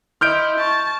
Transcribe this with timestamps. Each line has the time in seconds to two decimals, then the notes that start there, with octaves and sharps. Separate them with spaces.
0.21 E4 D#5 C6 F6 G6 D7
0.60 A5 C#6